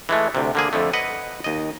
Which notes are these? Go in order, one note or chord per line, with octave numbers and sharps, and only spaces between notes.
E3 G#3 A3
D2 C3
D3 A#3 G#4
F2 D3 A3
B4 D#5 F#5
D#2 D#5